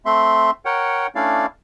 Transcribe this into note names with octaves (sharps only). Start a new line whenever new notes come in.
A3 C4 E5 C6
A#4 C#5 F#5 G5
A3 C#4 D4 E4 D5 F5